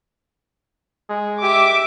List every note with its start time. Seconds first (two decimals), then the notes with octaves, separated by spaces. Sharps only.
1.09 G#3
1.43 G4 E5 D6